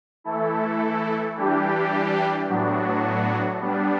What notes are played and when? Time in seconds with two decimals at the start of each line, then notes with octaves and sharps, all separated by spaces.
0.24 E3 A3 E4 A4
1.36 E3 G3 D4 G4
2.48 A2 F#3 B3 D4 F#4
3.60 G3 B3 D4